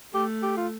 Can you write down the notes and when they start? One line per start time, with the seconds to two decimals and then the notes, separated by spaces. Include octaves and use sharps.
0.13 A3 G4
0.43 G4
0.57 F4